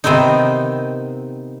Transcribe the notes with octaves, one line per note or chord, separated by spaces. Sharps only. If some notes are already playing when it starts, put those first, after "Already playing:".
C3 D#3 B3 C4 D#4